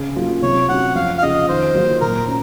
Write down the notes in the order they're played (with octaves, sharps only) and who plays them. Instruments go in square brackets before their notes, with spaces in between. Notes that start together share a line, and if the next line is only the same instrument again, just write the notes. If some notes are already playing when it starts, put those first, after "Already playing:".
Already playing: [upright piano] C#3
F#3 A#3 F4
[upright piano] C3 [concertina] C#5
[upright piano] F#3 C#4 F#4 [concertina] F#5
[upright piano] F2 [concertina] F5
[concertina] F5
[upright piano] C#3 F3 [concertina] D#5
[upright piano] D#3 [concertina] C5
[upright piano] F#3 A#3 F4
[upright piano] A#2 [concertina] A#4
[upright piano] C#4